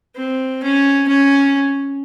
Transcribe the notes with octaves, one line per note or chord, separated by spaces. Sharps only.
C4
C#4
C#4